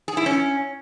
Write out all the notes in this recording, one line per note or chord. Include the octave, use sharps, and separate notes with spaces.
G#4
E4
C#4